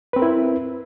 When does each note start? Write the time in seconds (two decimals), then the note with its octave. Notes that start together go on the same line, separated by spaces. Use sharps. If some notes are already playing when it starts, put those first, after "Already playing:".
0.13 B4
0.16 C4
0.19 A#4
0.22 E4